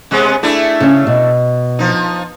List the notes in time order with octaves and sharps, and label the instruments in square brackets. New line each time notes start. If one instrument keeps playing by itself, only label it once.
[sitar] C3 G#3 B3
A3 D4 E4
[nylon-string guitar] C#3 C#4
B2
[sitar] F3 D#4